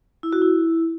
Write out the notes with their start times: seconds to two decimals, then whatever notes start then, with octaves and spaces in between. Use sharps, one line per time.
0.23 E4
0.33 F#4
0.42 E4